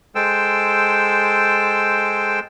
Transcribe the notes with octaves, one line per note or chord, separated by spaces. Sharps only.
G#3 A4 C5 G5 E6